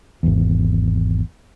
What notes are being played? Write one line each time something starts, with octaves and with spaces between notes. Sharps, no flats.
G#1 E2